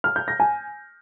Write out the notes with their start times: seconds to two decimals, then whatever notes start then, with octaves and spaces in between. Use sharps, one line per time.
0.04 F6
0.16 G6
0.28 A#6
0.40 G#5